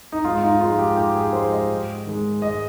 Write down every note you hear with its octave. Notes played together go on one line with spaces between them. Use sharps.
D#4
G#2 F4
D#4
F3 G#3 F4
G4
G#2 G4
G#4
F3 G#3 C5
D#5
G#2
D#3 G#3
G#2 D#5